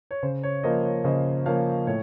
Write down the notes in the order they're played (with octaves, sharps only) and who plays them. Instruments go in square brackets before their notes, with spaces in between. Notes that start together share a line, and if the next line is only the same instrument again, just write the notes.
[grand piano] C#5
C#3 C5
C#5
F3 A#3 C5 D#5
C#5
C#3 C5 D#5
F3 A#3 C#5 F5
A2 C#5